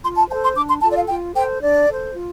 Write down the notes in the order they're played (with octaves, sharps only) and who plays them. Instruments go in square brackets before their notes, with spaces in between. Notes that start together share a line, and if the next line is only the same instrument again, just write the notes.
[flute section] F4 C6
A5
C5 A5
A4
C6
D4 D6
C6
F4 A4 A5
D5
F5
F4 G5
A4 C5 G5
D4 D5
A4 C5
F4